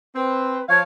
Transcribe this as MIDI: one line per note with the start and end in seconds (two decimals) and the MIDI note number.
0.15 0.60 60
0.15 0.67 71
0.68 0.83 53
0.68 0.83 73
0.68 0.83 77
0.68 0.78 92